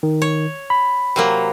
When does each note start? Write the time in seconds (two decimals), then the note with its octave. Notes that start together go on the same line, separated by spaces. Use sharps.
0.03 D#3
0.22 C#5
0.70 B5
1.16 C3 F#3 A#3